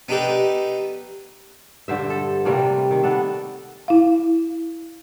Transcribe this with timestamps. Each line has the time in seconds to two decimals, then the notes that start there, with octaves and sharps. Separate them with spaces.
0.09 B3 D4 D#4 G4 A4 B4
1.88 G2 D3 C5 E5
2.10 A4
2.45 C3 G3 A3 A#3
2.91 D#3
3.03 B3 D4 A4
3.88 E4 F5